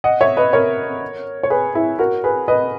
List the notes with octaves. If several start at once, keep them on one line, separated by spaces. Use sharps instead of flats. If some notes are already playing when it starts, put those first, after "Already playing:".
D#5 F#5
C#5 E5
B4 D#5
A#4 C#5
C#5
G#4 B4
E4 G#4
F#4 A#4
G#4 B4
B4 D#5